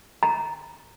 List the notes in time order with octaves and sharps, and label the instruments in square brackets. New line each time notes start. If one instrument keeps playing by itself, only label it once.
[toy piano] A#5